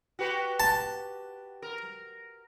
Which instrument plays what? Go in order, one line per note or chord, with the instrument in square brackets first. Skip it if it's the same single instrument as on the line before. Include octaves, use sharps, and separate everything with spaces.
[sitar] F#4 G4 B4
[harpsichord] A5
[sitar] A#4